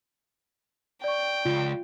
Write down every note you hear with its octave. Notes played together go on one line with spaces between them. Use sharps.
D5 G5 C#6
C#2 F4